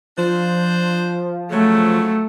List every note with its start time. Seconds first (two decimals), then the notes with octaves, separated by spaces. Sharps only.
0.18 F3 D4 C5
1.51 C#3 F#3 A3